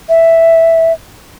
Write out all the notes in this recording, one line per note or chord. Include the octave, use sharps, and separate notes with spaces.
E5